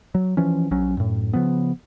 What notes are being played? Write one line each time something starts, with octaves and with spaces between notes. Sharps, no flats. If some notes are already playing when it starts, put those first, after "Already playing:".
F#3
E3 F3 C#4
A#1 F#3 C#4
F#2 A2
C#3 F3 B3